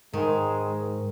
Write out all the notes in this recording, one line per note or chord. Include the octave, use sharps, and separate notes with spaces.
G#2 D#3 G#3